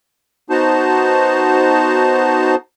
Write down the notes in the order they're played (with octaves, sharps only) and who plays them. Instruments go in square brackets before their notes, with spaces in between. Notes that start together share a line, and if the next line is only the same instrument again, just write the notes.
[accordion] B3 D#4 F#4 C5 A5